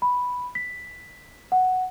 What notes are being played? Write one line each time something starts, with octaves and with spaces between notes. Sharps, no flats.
B5
B6
F#5